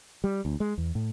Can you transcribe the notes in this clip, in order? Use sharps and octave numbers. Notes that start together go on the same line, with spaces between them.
G3
D2
G#3
E2
A2